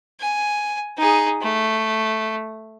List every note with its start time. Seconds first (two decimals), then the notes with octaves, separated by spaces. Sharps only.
0.20 G#5
0.98 D#4 G#4
1.42 A3